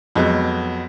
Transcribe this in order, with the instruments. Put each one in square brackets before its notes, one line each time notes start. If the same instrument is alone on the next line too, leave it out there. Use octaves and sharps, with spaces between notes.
[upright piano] F2 F#3 G#3 B3